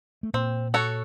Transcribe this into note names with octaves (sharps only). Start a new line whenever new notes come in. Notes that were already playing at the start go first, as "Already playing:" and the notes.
A3
A#2 A#3 C4
F#4 A4 C#5